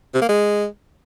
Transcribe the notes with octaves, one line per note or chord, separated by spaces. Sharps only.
C3
A#3
G#3